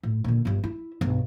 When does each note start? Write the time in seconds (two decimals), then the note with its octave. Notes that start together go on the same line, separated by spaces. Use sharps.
0.03 A2
0.24 A#2 D3
0.45 G1 G2
0.64 E4
1.01 B1 G2